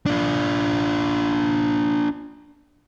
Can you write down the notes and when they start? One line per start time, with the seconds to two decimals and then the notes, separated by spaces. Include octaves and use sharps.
0.06 D4 F4